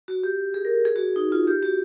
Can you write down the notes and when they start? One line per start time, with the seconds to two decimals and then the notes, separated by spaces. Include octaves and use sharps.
0.08 F#4
0.24 G4
0.54 G#4
0.65 A#4
0.85 G#4
0.96 F#4
1.16 D#4
1.32 F4
1.47 G4
1.62 F#4